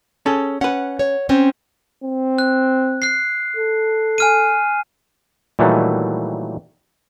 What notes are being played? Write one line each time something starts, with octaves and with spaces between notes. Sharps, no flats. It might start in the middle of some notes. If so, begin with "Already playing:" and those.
C#4 G#4 A4
C#4 B4 F#5
C#5
C4 C#4 C5
C4
F#6
F#6 C7
A4
G#5 F6 D#7
A#2 D#3 E3 F#3 G3 A3